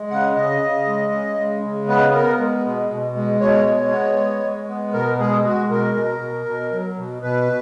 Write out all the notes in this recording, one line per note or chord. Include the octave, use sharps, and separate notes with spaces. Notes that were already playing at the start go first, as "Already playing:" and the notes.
Already playing: G#3
C#3 F#5
C#3 D#5
C#3
G#3
C#3
G#3
C#3
B3 B4
B3 A#4
G#3
B2
B2
G#3
B2 C#5
G#3
B3
G#3
G#3
B3
B2 A#4
G#3 G#4
G#3 F#4
B2 A#4
B2
B2
B2
F#3
B2
B2 B4